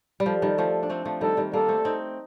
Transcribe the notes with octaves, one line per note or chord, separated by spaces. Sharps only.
G3
F3 A4
D#3 G3
F3 A3
D4
A3 C4
F3 A3
D#3 G3 A4
D#3 G3
G3 A#3 A4
A3 C4
C4 D#4